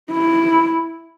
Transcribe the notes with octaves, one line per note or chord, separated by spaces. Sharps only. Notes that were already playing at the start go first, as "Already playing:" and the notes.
E4